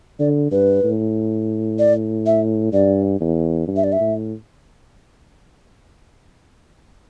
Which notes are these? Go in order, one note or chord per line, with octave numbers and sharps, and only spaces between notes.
D3 D5
G2 B4
A2
D5
E5
G2 D5
E2
G2
E5
D5
E5
A2